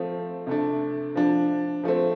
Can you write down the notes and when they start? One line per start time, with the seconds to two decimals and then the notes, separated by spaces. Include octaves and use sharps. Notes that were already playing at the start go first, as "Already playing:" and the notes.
Already playing: F3 A3 C4
0.47 C3 A3 D4
1.15 F3 D4
1.84 F3 A3 C4